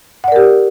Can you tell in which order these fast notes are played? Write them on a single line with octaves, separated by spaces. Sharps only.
F#5 D5 A#4 G4